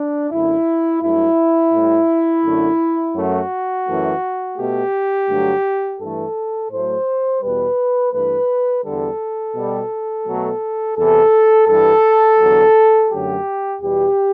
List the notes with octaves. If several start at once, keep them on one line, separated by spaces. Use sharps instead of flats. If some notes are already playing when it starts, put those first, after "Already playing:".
Already playing: D4
F#2 D3 A3 E4
G2 F#3 A3 E4
A2 G3
F#2 D3 A3
F#2 F#3 A3 F#4
F#2 E3 A3
B2 A3 G4
G2 D3 F#3 A3
G2 E3 A3 A4
A2 F#3 A3 C5
E2 B2 G3 B4
G2 E3 A3 B4
E2 D3 G3 A4
B2 G3
B2 F#3 A3
E2 C3 E3 A4
G2 E3 G3 A4
E2 D3 F#3
F#2 D3 F#3 A3 G4
E2 B2 G3 G4